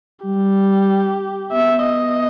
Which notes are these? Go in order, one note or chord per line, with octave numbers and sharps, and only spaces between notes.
G3 G4
B3 E5
D#5